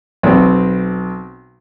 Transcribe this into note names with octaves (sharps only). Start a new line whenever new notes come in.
B1 C4